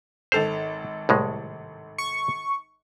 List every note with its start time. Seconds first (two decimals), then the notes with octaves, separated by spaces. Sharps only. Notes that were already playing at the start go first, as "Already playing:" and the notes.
0.32 G#1 A4 C5 F7
1.09 C2 A2 G#3
1.98 C#6